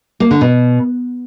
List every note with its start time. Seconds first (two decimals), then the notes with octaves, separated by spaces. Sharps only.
0.20 A#3
0.31 D3
0.41 B2